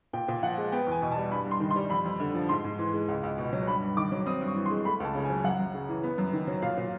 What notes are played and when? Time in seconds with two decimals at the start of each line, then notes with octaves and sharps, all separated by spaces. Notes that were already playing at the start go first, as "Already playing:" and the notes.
0.13 A#2 G5
0.28 A#2
0.43 F3 F#5
0.58 G#3
0.72 B3 G5
0.87 E2 G#5
1.02 B2
1.12 A5
1.16 G3
1.31 G2 B5
1.46 G2
1.51 C6
1.60 D#3
1.71 C6
1.76 G3
1.90 F2 B5
2.05 F2
2.20 D3
2.35 F3
2.49 G#2 C6
2.64 G#2
2.79 E3
2.93 G#3
3.08 C#2
3.23 C#2
3.38 B2
3.53 F#3
3.67 G2 B5
3.82 G2
3.97 D#3 D6
4.12 F#3
4.26 C4 D#6
4.41 G2
4.46 C#6
4.56 E3
4.66 C6
4.70 G#3
4.85 A3 B5
5.00 C#2 A5
5.15 C#3
5.24 G#5
5.30 F#3
5.44 F#2 F#5
5.59 F#2
5.74 C#3
5.89 E3
6.04 B3
6.18 F#2
6.33 D#3
6.48 F#3
6.62 A#2 F5
6.77 A#2